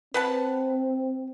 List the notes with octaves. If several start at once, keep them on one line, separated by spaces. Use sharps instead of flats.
C4 B4 F#5 A5